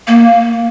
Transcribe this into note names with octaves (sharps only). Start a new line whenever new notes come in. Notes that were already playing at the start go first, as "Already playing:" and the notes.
A#3